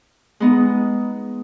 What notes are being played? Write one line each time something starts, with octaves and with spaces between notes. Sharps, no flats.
G#3 B3 D#4